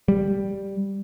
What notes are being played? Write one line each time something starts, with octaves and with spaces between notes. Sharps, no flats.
G3